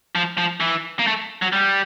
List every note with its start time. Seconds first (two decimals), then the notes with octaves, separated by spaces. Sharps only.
0.15 F3
0.38 F3
0.60 E3
0.99 A#3
1.07 A3
1.42 F#3
1.53 G3